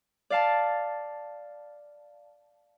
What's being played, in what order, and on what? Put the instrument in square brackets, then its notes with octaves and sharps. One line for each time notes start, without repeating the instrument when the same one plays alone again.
[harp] D5 F5 A5